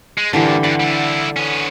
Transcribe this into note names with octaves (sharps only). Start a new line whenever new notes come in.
G#3
G2 A#2 D3 E3 G4
G2 D5 F#5 D6
G3 E4
B3 C#4